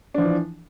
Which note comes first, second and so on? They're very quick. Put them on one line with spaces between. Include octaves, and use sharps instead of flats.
D4 F3 E3